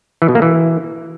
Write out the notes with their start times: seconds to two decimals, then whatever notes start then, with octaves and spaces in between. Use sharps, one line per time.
0.22 E3
0.28 B2
0.35 A#3
0.42 E3